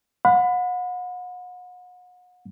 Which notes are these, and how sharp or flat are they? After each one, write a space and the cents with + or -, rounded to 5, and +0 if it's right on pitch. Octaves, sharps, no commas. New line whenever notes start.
F#5 -35 B5 +25